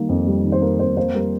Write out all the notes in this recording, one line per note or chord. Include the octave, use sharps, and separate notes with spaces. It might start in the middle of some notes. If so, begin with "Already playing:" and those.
Already playing: D#3 G3 A#3
F2
G3
D#3
C5
A#3 A#4
F2 C5
A#3 C5
G3 A#4